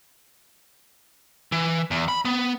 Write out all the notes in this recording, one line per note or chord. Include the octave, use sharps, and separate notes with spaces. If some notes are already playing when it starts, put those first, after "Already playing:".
E3
E2
B5
B3